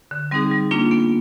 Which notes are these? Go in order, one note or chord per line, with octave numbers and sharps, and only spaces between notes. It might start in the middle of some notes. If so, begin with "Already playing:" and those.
D3
G3 C4 D#4 G#4
G3
A#3 D4 F4
B3